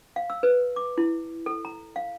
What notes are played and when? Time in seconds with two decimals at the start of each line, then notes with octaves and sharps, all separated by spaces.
0.16 F5
0.30 E6
0.43 B4
0.76 D6
0.98 E4
1.46 A4
1.65 A#5
1.96 F5